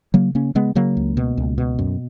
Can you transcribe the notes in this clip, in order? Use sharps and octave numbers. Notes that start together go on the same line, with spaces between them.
C#3 F#3 A#3
C#3 A#3 C#4
C#3 G#3 B3
C#3 F#3 A#3
C#2
B2
C#2
B2
F#2